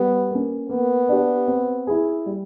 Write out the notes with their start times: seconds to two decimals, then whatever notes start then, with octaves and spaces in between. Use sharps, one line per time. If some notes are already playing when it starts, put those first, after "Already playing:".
Already playing: G3 B3
0.31 A#3 C#4
0.69 A#3 B3
1.09 D4 G4
1.48 C4
1.87 E4 G#4
2.26 G3